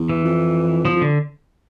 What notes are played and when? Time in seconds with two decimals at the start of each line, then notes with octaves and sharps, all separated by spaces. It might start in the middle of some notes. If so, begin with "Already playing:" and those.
Already playing: E2
0.09 E3
0.24 F2
0.85 E2 F3
0.96 F2
1.01 D3